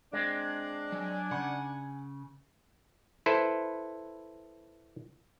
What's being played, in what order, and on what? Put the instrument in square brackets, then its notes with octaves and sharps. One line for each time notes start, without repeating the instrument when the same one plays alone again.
[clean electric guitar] G#3 C4 [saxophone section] D4
[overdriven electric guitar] F#3 [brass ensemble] G#5
[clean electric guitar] C#3 [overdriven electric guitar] F#5
[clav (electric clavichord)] E4 A4 B4 C5